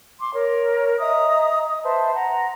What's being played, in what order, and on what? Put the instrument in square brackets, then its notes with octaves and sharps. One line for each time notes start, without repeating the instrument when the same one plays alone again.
[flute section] C6 D6
A#4 C#5
D#5 E5 A#5 D#6
D#5 D#6
B4 C5 E5 A5
F#5 A#5